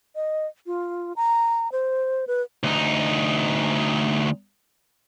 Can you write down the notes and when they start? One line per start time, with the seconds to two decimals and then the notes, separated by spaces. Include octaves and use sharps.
0.15 D#5
0.66 F4
1.16 A#5
1.72 C5
2.27 B4
2.64 D2 D#4